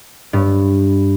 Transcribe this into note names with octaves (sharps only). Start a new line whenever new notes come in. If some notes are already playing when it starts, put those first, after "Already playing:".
G2